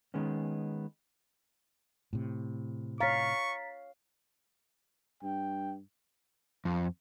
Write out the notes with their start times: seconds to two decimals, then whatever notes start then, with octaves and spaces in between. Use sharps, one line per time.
0.14 D#3 G#3 B3 C#4
2.13 A2 C3
3.00 C#5 F5 A#5 C#6 A6 B6
5.23 G2 G5
6.65 F2